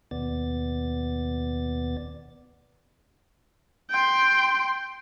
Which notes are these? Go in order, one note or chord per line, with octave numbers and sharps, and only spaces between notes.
D#2 B2 B3 D5 A6
G5 C6